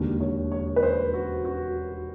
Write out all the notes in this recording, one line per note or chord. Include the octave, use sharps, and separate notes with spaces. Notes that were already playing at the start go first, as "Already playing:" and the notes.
Already playing: E1 D#2 D3
C#5
C#5
B4
C5
F#4
F#4